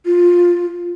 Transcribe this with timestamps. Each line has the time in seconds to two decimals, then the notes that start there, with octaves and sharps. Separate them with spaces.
0.06 F4